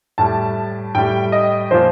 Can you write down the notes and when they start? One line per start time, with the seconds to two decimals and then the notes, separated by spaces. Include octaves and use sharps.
0.18 A2 G3 A5
0.95 A2 G3 G5
1.32 D#5
1.71 A#2 F3 C5